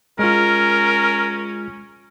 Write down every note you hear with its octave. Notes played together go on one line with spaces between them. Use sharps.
G#3 C#4 F4 A#4